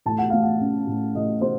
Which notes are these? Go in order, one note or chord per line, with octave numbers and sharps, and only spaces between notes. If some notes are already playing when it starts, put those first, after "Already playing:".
A2 A5
F#5
A3 F5
F#5
C#4
A2
A2 D#5
A3 C5